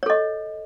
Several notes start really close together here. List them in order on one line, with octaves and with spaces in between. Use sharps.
C#5 A4 D#5